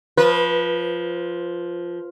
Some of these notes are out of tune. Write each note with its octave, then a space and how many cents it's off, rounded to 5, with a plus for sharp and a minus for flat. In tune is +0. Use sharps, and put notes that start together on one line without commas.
F3 +0 B4 -20